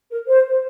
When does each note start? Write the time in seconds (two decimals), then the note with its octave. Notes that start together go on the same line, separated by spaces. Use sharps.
0.11 A#4
0.28 C5